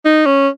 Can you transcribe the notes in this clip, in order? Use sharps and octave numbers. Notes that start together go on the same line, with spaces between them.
D#4
C#4